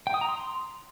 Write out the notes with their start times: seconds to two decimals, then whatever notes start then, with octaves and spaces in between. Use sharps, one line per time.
0.07 G5
0.14 D#6
0.21 A#5
0.29 C6